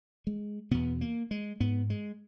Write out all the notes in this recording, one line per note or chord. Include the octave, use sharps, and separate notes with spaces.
G#3
E2 B2 B3
A#3
G#3
G#2 B3
G#3